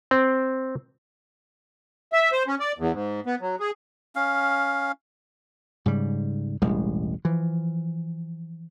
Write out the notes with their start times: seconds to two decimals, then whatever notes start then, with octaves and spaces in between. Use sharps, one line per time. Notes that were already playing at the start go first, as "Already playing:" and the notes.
0.11 C4
2.13 E5
2.32 C5
2.47 C#4
2.60 D5
2.78 E2
2.92 G#2
3.26 B3
3.41 F#3
3.60 G#4
4.16 C#4 F5
5.86 G#2 C#3 G3
6.62 E1 A1 G3 G#3
7.25 E3 F3